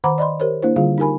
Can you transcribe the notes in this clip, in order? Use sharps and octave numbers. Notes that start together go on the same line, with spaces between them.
D#3 C5 F#5 A#5 B5 D6
D5 D#5 B5 C6
G4 A#4 C5 C#5
A#3 D4 E4 C5
D3 G3 F4 G#4 F5
D#4 G4 A#4 G#5 B5